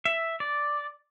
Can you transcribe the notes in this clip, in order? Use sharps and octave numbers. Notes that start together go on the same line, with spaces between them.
E5
D5